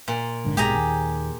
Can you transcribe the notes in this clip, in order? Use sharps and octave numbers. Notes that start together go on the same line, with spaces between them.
A#2
A#1 G#2 D3
B1 G#2 G#3 G4 G#4 A#5
D#2